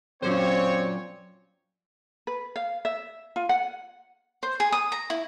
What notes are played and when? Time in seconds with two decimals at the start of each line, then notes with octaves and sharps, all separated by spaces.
0.22 F#2 A#2 F#3 C4 C5 C#5
2.27 B4
2.56 F5
2.85 E5
3.36 F4
3.49 F#5
4.43 C5
4.60 G#4
4.72 D#6
4.92 A#5
5.10 E4